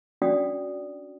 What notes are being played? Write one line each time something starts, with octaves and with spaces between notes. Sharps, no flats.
C#4 D4 F#4 D5 G5 D#6